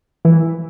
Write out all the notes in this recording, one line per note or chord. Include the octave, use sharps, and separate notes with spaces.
E3